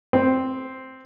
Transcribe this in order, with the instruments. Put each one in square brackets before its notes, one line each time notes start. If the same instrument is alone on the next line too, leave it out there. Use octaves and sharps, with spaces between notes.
[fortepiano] C4